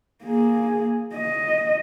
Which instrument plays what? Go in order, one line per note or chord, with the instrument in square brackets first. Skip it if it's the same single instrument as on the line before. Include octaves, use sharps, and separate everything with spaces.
[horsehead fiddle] A#3 G#4
D#5